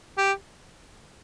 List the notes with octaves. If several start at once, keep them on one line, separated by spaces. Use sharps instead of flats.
G4